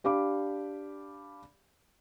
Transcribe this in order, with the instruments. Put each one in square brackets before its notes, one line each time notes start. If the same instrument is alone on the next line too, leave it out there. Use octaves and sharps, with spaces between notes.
[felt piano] D4 G4 F5 B5 D6